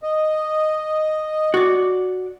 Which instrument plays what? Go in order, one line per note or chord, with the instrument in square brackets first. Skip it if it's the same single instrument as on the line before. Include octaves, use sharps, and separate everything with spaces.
[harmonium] D#5
[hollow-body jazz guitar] F#4 D5